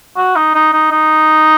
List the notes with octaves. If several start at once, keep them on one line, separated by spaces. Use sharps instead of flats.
F#4
D#4
D#4
D#4
D#4